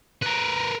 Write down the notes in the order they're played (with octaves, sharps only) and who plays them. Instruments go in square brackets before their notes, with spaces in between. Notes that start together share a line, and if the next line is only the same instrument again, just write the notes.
[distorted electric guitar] A#4 B4